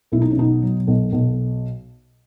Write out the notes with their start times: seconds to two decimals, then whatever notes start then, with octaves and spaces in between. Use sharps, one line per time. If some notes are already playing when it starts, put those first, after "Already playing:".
0.12 B1 E4
0.22 D#4
0.30 C#4
0.37 B2 D#4
0.62 F#3
0.87 B1
1.12 B1